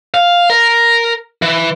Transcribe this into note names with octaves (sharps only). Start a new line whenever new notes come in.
F5
A#4
E3